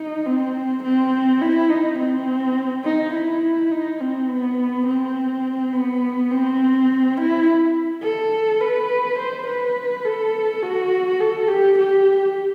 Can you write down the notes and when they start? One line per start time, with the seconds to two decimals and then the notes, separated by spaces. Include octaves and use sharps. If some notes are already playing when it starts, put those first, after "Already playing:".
Already playing: D#4
0.26 C4
0.83 C4
1.41 E4
1.70 D#4
1.99 C4
2.84 D#4
3.14 E4
3.71 D#4
4.01 C4
4.29 B3
4.86 C4
5.72 B3
6.31 C4
7.17 E4
8.03 A4
8.60 B4
9.19 C5
9.47 B4
10.05 A4
10.63 F#4
11.21 A4
11.48 G4
11.78 G4